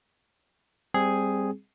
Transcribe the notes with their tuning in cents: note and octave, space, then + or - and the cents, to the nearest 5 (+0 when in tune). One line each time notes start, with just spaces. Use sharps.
G3 +20 C4 +0 G#4 +0